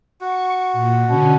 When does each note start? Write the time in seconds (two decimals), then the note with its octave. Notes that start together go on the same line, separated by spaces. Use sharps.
0.21 F#4 C#6
0.73 A#2
1.06 B2 D3 C#4